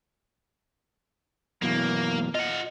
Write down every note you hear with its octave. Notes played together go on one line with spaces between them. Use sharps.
F#2 B2 E3 A#3
F4 D#5 F#5